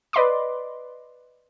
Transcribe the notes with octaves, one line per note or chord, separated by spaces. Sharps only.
B4 D5 D#5 B5 C6 D6